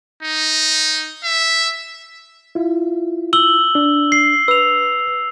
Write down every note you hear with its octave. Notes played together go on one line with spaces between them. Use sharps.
D#4
E5
E4 F4
E6 F#7 G7
D4
C7
B4 E6 F7